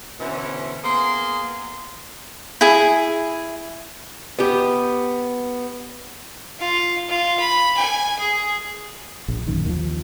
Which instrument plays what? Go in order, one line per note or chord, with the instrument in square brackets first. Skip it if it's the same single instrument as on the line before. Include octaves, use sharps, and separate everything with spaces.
[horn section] B2 D3 E3 C4 C#4 E4
A#3 B3 G#4 C6
[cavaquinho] E4 G#4
[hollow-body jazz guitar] B3 G4
[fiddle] F4
F4
B5
G#5
G#4
[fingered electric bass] A#1
A1 F#2 D#3
D#2 F3